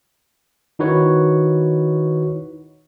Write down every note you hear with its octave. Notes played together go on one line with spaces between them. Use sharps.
D#3 D#4 E4 F#4 B4 C#5